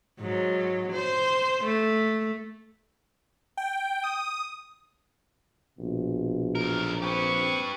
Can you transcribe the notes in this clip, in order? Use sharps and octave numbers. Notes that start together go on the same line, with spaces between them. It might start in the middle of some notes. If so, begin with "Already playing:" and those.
G#2 F#3
C5
A3
G5
D#6
A#1 B2
B1 A#4
C4 G4 B4 C#6